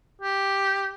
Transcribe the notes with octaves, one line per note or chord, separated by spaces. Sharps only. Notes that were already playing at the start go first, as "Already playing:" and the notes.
G4